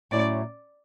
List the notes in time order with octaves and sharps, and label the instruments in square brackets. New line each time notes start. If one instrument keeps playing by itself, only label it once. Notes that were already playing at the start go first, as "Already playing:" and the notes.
[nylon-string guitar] A2 F#3 C#4 E4 [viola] D5